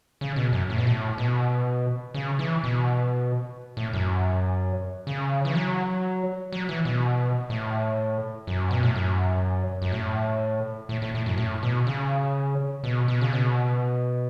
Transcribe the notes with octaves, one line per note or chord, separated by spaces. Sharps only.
C#3
B2
F#2
A2
B2
A2
B2
C#3
E3
B2
A2
F#2
C#3
E3
F#3
F#3
E3
B2
A2
F#2
B2
A2
F#2
F#2
A2
A2
A2
A2
F#2
A2
B2
C#3
B2
B2
C#3
B2